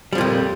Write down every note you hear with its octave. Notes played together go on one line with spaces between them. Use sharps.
F2 A#2 F3 G3